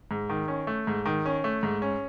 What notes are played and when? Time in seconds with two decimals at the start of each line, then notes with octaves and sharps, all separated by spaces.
0.11 G#2
0.29 D#3
0.48 C#4
0.67 A3
0.87 G#2
1.05 D#3
1.26 C#4
1.44 A3
1.63 G#2
1.82 C#4